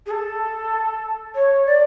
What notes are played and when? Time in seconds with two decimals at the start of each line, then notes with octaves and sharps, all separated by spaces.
0.06 G#4
0.11 A4
1.35 C#5
1.66 D5